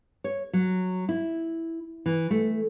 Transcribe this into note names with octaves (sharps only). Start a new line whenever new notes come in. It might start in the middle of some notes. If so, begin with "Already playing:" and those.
C#5
F#3
E4
E3
A3